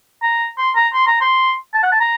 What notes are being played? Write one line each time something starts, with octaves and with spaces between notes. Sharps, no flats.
A#5
C6
A#5
C6
A#5
C6
A5
F#5
A5
A#5